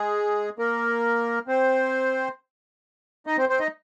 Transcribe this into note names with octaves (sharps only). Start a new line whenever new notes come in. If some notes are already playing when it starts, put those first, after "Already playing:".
Already playing: G#3 G#4
A#3 A#4
C4 C5
D#4 D#5
C4 C5
C4 C5
D#4 D#5